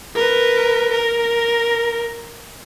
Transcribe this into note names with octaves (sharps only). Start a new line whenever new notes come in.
A#4 B4
A#4